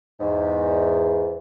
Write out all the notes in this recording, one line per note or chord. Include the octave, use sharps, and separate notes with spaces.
E2 G#2